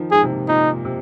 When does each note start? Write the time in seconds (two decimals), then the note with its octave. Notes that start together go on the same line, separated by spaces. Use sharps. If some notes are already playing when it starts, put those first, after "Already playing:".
Already playing: D#3 F3
0.11 G#2 G#4
0.23 C3
0.29 A#2
0.48 A#2 D#4
0.85 C3